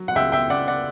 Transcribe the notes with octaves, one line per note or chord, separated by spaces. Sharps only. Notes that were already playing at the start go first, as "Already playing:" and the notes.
Already playing: F#3
F#5
C#2 E5 G5
E5 G5
C#2 D5 F#5
D5 F#5